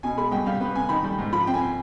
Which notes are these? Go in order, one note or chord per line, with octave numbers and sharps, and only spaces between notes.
B2 G#5
G#3 B5
C2 G5
G3 F5
B3
C3 G#5
D#3 B5
G3
G#2
F3 B5
C4 G5
G#5